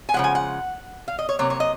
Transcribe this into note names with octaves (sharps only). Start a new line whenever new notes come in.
G#5
C#3 F3 G#3 F#5
G#5
F#5
F5
D#5
C#5
C3 F#3 A#3 C#5
C#5
D#5